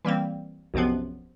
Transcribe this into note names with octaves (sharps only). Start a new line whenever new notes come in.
E3 G3 A#3 C4
B1 F#2 C3 F3 B3